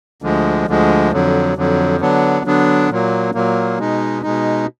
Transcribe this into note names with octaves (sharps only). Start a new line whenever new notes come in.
D2 D3 F3 G#3
D2 D3 F3 G#3
F2 D3 F#3
F2 D3 F#3
D3 F#3 B3 D4
D3 F#3 B3 D4
A#2 F#3 A#3
A#2 F#3 A#3
B2 G#3 D#4
B2 G#3 D#4